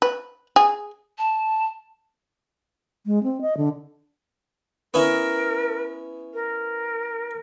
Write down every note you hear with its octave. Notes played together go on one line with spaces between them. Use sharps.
B4
G#4
A5
G#3
C4
D#5
D3
B3 C#4 E4 A#4
A#4